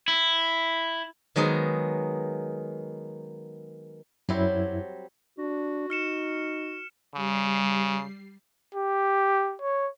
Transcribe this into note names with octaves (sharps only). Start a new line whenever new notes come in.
E4
D#3 F#3 G#3 B3 G#4
F#2 F#3 G3 C4 E4
D4 F#4
D#4 F6 C#7 E7
C#3 G3 C7
G4
C#5